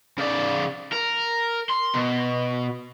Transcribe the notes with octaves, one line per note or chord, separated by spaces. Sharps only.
C#3 D5
A#4
C6
B2